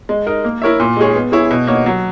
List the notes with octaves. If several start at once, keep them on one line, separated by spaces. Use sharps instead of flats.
G#3
D#4 A#4
A#3
E4 A#4 C#5 E5
A#2
G#3 D#4 G#4 C#5
B3
E4 G#4 C#5
B2
A#3 D#4 F#4 C#5
F#3